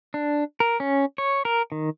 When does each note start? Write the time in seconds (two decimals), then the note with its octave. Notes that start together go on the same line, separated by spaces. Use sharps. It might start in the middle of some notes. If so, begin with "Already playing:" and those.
0.14 D4
0.60 A#4
0.80 C#4
1.18 C#5
1.45 A#4
1.72 D#3